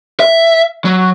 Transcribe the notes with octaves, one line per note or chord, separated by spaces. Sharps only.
E5
F#3